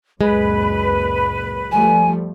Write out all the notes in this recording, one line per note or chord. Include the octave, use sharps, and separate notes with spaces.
C#2 F#2 A#2 G#3 B4
F3 G3 A3 G#5